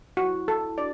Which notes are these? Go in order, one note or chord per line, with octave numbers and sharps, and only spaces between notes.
E4 F#4
A4
D4 F#4 D5